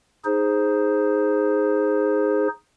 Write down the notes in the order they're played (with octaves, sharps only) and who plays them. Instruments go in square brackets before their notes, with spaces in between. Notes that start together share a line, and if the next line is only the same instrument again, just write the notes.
[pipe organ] D#4 G#4 C5